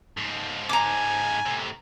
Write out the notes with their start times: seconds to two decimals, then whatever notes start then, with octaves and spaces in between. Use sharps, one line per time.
0.17 G#2 F3
0.69 G#5 A#5 D6
1.46 A2 C3